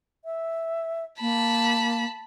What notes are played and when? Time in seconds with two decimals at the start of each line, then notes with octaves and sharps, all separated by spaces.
0.25 E5
1.21 A#3 A5 B5